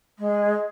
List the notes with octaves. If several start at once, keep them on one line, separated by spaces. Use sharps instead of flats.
G#3